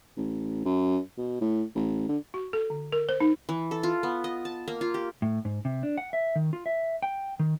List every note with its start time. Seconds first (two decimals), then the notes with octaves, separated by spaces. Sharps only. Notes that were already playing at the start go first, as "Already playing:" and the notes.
0.17 A1
0.65 F#2
1.18 B2
1.41 A2
1.75 A1
2.08 D3
2.34 F#4
2.53 A4
2.70 D3
2.92 A#4
3.09 C5
3.20 D#4
3.49 E3
3.71 A4
3.83 F4
4.03 B3
4.24 D#5
4.45 A5
4.68 A#3
4.81 F4
4.94 G4
5.22 A2
5.45 G#2
5.65 C3
5.83 D4
5.98 F#5
6.13 E5
6.35 D#3
6.53 F4
6.66 E5
7.02 G5
7.39 D#3